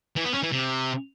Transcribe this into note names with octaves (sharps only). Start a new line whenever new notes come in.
E3
B3
C#4
E3
C3